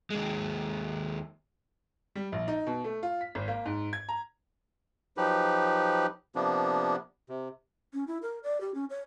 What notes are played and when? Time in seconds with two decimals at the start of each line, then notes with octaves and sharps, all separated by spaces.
0.10 D#2 G#3
2.15 G3
2.32 A#1
2.48 D#4
2.67 B2
2.84 A3
3.03 F4
3.21 B6
3.35 G#1
3.48 A#3
3.66 G#2
3.93 G#6
4.09 A#5
5.17 F3 F#3 D#4 G4 B4
6.35 C3 F3 A#3 B3 D4
7.29 C3
7.93 C#4
8.07 E4
8.22 A#4
8.44 D5
8.61 G4
8.75 C#4
8.90 C#5